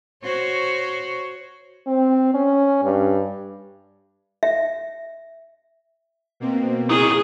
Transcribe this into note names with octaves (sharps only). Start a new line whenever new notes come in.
F#4 C5 C#5
C4
C#4
G2
E5
B2 A#3 C4
C#3 D#4 E4 G#4